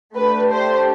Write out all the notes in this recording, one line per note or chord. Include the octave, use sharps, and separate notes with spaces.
A3 D4 G4 B4
C5